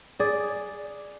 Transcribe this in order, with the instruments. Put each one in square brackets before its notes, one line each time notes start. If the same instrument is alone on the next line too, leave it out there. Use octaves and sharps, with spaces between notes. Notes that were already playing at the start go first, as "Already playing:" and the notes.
[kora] G#4 D5